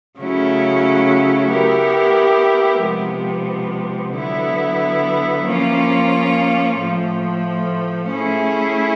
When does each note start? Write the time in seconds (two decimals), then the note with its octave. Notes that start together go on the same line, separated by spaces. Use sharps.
0.19 C#3 F#3 A3 C#4 E4
1.51 B3 E4 G4 A#4
2.83 C3 F3 G#3 B3
4.14 D3 F#3 B3 E4
5.46 F3 A#3 C#4 F4
6.78 A2 F3 A3
8.10 A3 C#4 E4 G#4